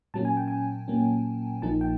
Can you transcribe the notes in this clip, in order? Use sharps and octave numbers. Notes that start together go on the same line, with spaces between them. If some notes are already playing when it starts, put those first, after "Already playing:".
A#2 F#3 A#3 C#4 A5
G#5
G5
G#5
A#2 F#3 A#3 C#4
A#1 A#2 F3 A#3 D#4 A5
G5